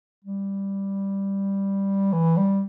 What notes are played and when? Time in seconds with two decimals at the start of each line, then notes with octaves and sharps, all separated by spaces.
0.24 G3
2.12 E3
2.37 G3